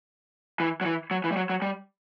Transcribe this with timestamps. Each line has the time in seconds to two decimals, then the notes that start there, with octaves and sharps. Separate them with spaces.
0.60 E3
0.81 F#3
0.85 E3
1.11 F#3
1.24 E3
1.32 G3
1.37 F#3
1.50 F#3
1.62 G3